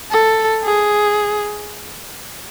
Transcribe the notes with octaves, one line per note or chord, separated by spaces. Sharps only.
A4
G#4